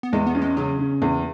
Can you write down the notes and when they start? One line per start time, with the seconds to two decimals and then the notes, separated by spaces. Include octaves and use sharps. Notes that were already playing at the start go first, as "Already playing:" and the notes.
0.03 B3
0.13 E2 G#3
0.27 B3
0.35 C#4
0.42 G#3
0.57 C#3 F#3
0.79 C#3
1.02 E2